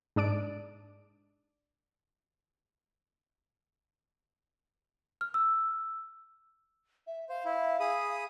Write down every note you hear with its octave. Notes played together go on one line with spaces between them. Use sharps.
G#2 D4 D5 D7
F6
E6
E5
C5 F5
E4
G#4 B5 D#6